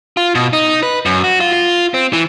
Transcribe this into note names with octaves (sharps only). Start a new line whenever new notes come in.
F4
B2
D#4
B4
F#2
F#4
F4
F4
C4
E3